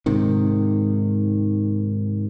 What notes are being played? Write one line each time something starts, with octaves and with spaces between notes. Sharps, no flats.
G#2 C3 D#3